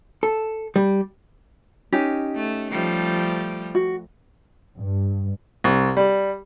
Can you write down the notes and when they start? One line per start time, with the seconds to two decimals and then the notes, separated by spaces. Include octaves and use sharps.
0.23 A4
0.76 G3
1.92 C#4 D#4 G4
2.35 A3
2.71 F3 G3 A3
3.75 F#4
4.77 G2
5.64 C2
5.97 G3